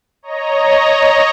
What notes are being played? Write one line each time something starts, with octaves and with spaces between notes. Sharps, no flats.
C#5 D#5 A#5